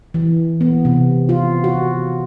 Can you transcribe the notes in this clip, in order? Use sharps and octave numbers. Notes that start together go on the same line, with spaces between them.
E3
B3
C3
F4
F#4